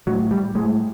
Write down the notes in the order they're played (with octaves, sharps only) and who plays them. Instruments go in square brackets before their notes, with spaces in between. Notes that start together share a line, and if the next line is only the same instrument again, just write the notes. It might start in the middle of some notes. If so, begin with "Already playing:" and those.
[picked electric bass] A2 F#3
G3
A2 G#3